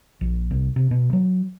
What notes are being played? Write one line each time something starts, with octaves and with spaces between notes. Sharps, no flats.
A#1
C2
C3
B2
F#3